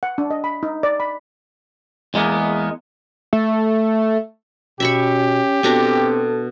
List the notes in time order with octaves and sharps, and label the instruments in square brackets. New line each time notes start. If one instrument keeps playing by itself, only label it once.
[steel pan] F#5
D4
D#5
B5
D#4
D5
B5
[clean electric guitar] E2 G#3 A#3 B3
[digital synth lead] A3
[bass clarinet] B2 [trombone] C#4 [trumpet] G4 [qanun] E5 B5 C#6
[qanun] B2 D4 A#5 [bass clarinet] C4 [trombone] A4